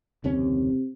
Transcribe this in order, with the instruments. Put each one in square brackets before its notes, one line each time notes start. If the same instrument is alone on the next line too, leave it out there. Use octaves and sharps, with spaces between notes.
[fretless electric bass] F#1 D#2 C#4 [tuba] C3